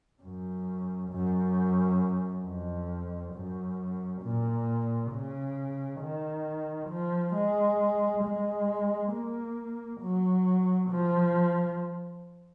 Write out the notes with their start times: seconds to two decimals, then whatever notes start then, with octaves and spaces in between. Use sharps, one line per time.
0.23 F#2
1.11 F#2
2.45 F2
3.34 F#2
4.22 A#2
5.12 C#3
6.01 D#3
6.90 F3
7.35 G#3
8.24 G#3
9.12 A#3
10.01 F#3
10.91 F3